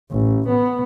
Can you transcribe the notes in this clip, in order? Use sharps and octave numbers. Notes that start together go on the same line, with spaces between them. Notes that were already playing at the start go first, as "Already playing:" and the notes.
A1
B3